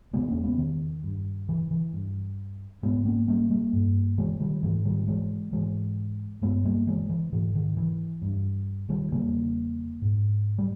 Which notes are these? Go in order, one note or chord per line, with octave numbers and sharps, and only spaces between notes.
E2 C#3 G#3 B3
A#3 C#4
G#3 B3
D#3
G2
E3
E3
G2
G#2 G#3 B3
A#3 C#4
G3 A#3
G3 A#3
G2
E3 G#3
D#3 G3
G#2 E3
D#3 G3
E3 G#3
G#2 E3 G#3
G2 G#3 B3
G3 A#3
E3 G#3
E3
G#2 E3
D#3
E3
G2
D#3 G3
E2 C#3 G3 A#3
G#2
G3